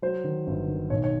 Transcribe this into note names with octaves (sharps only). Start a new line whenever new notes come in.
F#3 C5
D#3
G1
D#3
B1 C#5
C#5